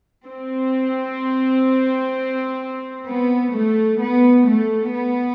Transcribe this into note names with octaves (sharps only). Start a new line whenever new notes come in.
C4
B3
A3
B3
A3
B3